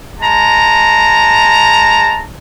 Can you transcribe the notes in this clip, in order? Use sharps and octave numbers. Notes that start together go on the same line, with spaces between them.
G#3 A5 A#5